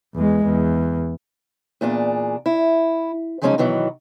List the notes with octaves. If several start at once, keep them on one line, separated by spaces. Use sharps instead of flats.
E2 G#3
E2
E2 A#2 D4 G#4
E4
C#3 F3 F#3 G#3 C#4 D#4
B2 D#3 E3 F#3